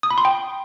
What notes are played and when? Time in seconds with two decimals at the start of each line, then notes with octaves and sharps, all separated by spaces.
0.03 D#6
0.10 B5
0.18 C6
0.25 G5